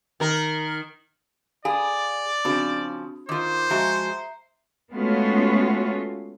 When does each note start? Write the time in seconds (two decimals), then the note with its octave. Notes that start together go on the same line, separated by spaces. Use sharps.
0.20 D#3 A#4
1.65 G#4 D5 F5
2.45 C#3 F3 C4 D4 F#4
3.29 D#3 F4 C5 D6
3.70 F3 G#3 F#4 E5 A#5 C7
4.92 G#3 A3 B3 C#4 F4 F#4